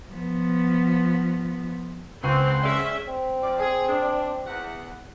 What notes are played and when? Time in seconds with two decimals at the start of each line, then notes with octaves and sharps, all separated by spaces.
0.10 F3 B3
2.23 C#2 G#3 C4 F#5 C6 C#6 D#7
2.63 C#4 G#4 D5 E5
3.07 C4
3.43 F3 D5
3.60 G#4
3.89 D4
4.46 E2 F#5